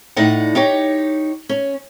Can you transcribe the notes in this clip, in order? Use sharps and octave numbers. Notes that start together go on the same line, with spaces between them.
A2 D#4 D5 F#5
D#4 G4 C#5
C#4